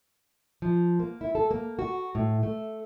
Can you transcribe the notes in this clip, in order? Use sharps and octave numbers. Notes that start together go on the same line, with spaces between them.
F3
A#3
E4
A4
A#3
F#4
A2
A3